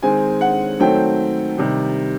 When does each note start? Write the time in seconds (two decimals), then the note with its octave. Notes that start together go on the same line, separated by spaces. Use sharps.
0.02 D#3 G#3 C4 G#5
0.41 F#5
0.80 D#3 F#3 A3 C4 G5
1.58 C3 D#3 G3